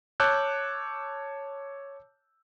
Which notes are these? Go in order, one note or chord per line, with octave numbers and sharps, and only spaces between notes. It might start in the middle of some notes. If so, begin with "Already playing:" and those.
C#5 A5 D6 E6 F#6 G6